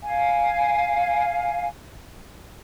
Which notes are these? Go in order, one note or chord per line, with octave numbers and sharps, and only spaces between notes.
F5 G#5